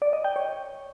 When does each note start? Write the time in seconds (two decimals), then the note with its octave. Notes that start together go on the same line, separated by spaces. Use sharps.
0.02 D5
0.13 D#5
0.24 G5
0.36 C#5